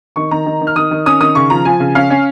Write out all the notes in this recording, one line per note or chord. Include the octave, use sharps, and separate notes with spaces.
D#3 C#6
D#3 A#5
D#3
D#3
F6
D#3 D#6
D#3
C#4 D#6
D#3 D#6
C#3 C#6
F3 A#5
F3 G#5
C#3
C#4 F5
C#4